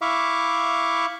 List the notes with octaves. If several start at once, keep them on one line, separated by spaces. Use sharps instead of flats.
E4 E5 F5 C#6 D6